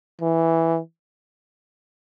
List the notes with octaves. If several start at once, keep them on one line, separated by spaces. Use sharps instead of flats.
E3